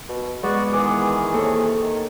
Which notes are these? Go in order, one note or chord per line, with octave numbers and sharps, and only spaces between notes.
B2
G#3 B3 F#4 D5
D#3 E3 G#4 B4 D6
C3 A#3 A4 C#5
D#3